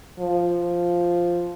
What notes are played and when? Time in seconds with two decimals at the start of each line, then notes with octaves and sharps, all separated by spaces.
0.20 F3